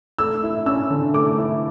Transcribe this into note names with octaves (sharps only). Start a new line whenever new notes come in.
A3 E6
E4
C#4 E6
D3
A3 D6
E4